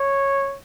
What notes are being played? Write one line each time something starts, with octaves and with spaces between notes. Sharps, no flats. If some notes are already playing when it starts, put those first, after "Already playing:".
Already playing: C#5